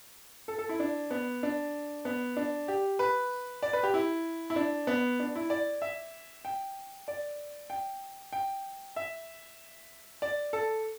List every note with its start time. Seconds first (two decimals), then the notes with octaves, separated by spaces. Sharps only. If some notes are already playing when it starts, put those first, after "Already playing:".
0.48 A4
0.58 A4
0.69 E4
0.80 D4
1.11 B3
1.43 D4
2.05 B3
2.37 D4
2.68 G4
2.99 B4
3.63 D5
3.73 B4
3.83 G4
3.94 E4
4.50 E4
4.56 D4
4.87 B3
5.20 D4
5.35 E4
5.50 D5
5.82 E5
6.45 G5
7.08 D5
7.70 G5
8.33 G5
8.96 E5
10.22 D5
10.53 A4